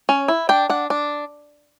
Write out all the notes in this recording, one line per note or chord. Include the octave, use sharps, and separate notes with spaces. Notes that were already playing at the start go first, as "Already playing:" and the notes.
C#4
E4
D4 G5
D4 F#5
D4